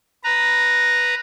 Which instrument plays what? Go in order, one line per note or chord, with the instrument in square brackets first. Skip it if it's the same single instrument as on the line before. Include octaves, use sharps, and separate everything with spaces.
[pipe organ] B4 A#5